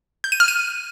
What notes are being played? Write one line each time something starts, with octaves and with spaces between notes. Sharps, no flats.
G6
D#7
F6
D#7